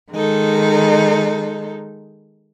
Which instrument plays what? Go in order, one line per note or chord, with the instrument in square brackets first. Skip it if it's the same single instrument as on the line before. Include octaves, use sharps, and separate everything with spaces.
[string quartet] D#3 G#3 D#4 A4